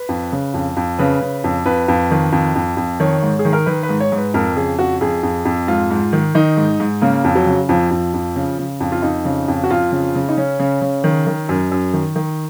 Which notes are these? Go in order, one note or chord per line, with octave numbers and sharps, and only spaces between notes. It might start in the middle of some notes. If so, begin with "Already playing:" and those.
Already playing: B4
F2
C#3
F2
F2
C#3 B4
C#3
F2
F2 B4
F2
D#3
F2
F2
F2
D#3 C#5
G#2
G#4
D#3
A#4
D#3 B4
B4
G#2
C#5
G#2
B4
F2 A#4
C#3 G#4
F2 F#4
F2 G#4
F2
F2
G#2 F4
G#2
D#3
D#3 D#4
G#2
G#2
C#3 A#3
F2
F#3
C#3
F2 F3
F2
F2
C#3
C#3
F2
F4
F2 D#4
C#3
F2
F#4
F2 F4
C#3
C#3
D#4
C#3 C#4
C#3
C#3
D#3
D#3
F#2
F#2
D#3
D#3